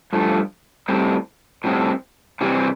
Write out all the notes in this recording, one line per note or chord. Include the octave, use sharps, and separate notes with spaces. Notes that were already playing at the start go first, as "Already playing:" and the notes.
G2 F3 A3
A2 G3 C4
A2 G3 C4
C3 E3 G3 C4